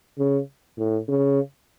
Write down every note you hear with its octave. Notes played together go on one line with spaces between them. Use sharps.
C#3
A2
C#3